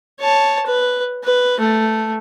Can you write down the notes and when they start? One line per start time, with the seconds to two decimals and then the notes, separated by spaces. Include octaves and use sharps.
0.20 C#5 A5
0.66 B4
1.24 B4
1.60 A3